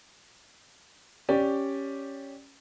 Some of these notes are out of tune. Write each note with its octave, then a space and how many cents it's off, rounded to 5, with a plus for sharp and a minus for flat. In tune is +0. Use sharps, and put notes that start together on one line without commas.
C#4 +0 G4 +0 D5 +0